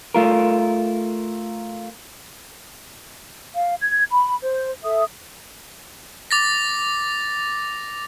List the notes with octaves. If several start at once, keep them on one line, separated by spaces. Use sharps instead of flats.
A3 F4 A#4
F5
G#6
B5
C5
A4 E5 D#6
D6 A6 A#6